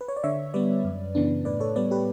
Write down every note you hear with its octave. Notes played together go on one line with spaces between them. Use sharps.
B4
C#5
D5
D3 C#5 E5
G3 B3 B4 D5
F#2
C#3 E3 B3 D4
A2 B4 D5
A4 C#5
G3 B3 B4 D5
G4 B4